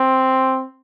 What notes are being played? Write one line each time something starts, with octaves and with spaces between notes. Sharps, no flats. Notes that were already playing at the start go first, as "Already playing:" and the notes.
Already playing: C4